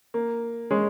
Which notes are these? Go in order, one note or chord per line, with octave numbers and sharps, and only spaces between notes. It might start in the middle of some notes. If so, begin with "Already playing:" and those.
A#3
G#3 C#4